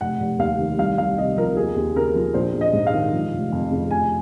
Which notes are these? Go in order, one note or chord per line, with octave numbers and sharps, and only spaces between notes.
F1 F#5
F1
D#2 F5
D#3
C2 F5
C2 F5
C3 D#5
F3 A#4
D#2 G#4
D#2
C#3 A#4
F3
A#1 C5
A#1
D#5
G#2
F5
D#3
F3
F1
F2
C#3
F1 G#5